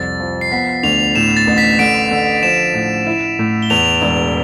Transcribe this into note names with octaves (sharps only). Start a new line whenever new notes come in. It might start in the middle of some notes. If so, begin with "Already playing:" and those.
Already playing: C2 F2 A6
F3
C7
B3 B6
D2 F7
A2 E7
A6
A1
B6
D3 D7
D3
F3 E7
A2
E4
A2
G7
E2 F7
E1